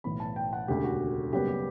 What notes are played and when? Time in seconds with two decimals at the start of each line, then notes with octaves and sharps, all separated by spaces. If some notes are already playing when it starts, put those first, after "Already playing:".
0.04 B1 A2 E3 B3 B5
0.20 A5
0.36 G5
0.53 F#5
0.68 E1 D2 C#3 G4
0.84 F#4
1.32 F#1 F#2 C#3 G3 B3 G4
1.48 G4